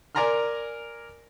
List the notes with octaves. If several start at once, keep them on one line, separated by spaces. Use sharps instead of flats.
A#4 D5 G#5 A#5 C6 F6